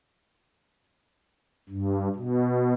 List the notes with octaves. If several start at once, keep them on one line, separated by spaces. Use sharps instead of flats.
G2
B2